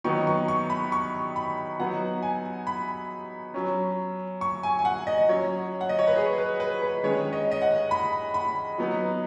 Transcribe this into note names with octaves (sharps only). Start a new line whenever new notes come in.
D#3 F#3 B3 D#4 C#6
C#6
C#6
B5
C#6
B5
F#3 B3 D#4 F#5
G#5
B5
F#3 C#4
C#6
G#5
G#5
F#5
D#5
F#3 C#4 C#5
F#5
D#5
C#5
B4
G#4
B4
B4
B4
D#3 G#3 C#4 C#5
D#5
D#5
F#5
B5
B5
F#3 B3 D#4